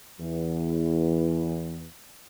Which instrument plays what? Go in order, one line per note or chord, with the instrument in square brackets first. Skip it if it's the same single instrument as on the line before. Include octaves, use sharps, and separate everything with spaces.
[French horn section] E2 E3